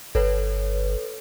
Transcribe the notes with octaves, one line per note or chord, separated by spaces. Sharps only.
G1 A4 B4 C#5